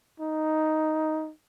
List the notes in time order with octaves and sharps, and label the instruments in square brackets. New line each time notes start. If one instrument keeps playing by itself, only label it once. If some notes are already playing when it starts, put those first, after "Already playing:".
[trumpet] D#4